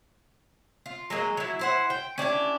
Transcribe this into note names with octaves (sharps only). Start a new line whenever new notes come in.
F4
F#3 G#3 A#3 D#5
F#3 E4
E4 C5 F#5
G5
C#4 D4 E4 G4